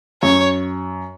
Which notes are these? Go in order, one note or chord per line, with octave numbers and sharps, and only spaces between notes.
F#2 C#5